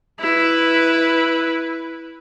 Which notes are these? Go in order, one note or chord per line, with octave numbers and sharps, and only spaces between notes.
E4 B4